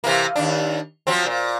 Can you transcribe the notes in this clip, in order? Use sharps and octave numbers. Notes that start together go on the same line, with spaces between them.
C3 E3 A#3
D#2 G#2 D4
F3 F#3 C4
A#2